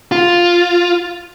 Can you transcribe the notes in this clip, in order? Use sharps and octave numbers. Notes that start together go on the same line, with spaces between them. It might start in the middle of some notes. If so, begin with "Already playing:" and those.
F4